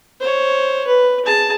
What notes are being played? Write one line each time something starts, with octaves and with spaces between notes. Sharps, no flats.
C5 C#5
B4
G#4 A5